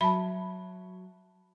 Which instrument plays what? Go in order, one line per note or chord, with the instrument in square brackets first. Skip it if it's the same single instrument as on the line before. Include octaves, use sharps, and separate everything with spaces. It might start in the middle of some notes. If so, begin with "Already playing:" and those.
[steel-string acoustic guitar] F#3 [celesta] E5 A5 [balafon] B5